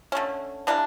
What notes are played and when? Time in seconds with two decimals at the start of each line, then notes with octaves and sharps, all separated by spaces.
0.12 D3 A3 C#4
0.67 E3 G3 A#3 D4